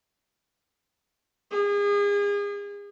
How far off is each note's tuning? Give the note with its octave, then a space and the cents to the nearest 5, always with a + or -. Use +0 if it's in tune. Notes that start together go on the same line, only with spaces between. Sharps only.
G#4 -35